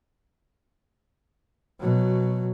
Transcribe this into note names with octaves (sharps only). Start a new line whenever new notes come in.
B2 F#3